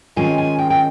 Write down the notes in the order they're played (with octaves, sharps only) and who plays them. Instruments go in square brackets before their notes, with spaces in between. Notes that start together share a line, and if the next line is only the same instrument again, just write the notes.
[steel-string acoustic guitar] D#3 G#3 C#4 F4 G#5
G#5
G5
G5